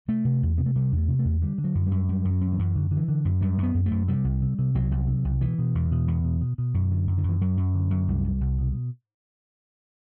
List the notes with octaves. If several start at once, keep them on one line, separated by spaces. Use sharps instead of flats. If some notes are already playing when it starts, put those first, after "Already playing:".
C3 A3
C3
E2
C3 B3
A3
C3 G3
E2
A3
C3
A3
E2
D3 G3
D3
F#3
F#2
F#2 G3
F#2 G3
F#2
F#3
F#2
E3
F#2
F#2 D3
D3
E3
D3
F#2
F#2 G3
F#2
B3
F#2
A3
F#2
C3 G3
C2
C3
C3
C2 F#3
C2
C3
C2
B2 E3
B2
E2
B2
E2
B2
B2
B2
F#2
D3
F#2
D3
F#2
E3
F#2 F#3
F#2
D3
F#2
C2 G3
C2
C2
B2